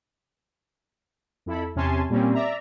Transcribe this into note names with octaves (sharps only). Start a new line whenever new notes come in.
F2 E4 A4 B5
E2 C3 C#4 G#5 A5 C6
A#2 G3 A#3 C4 C#4
D5 E5 A#5